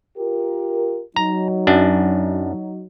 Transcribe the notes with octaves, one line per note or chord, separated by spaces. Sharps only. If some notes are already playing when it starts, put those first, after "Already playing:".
F4 G4 A#4
F#3 D#4 A#5
F#2 D4